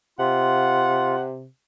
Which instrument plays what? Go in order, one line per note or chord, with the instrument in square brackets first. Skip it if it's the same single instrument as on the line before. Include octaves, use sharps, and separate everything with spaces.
[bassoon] C3 [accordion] F4 [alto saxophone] F#5